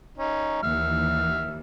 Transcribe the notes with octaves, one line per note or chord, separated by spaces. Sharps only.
C#4 D#4
D#2 E3 E5 F6